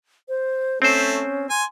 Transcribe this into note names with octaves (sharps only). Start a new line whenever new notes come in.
C5
A3 C4 C#4 C5
G#5 C6